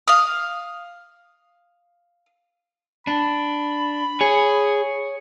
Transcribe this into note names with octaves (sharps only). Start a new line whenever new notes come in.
F5 D#6
D4 B5
G#4 C#5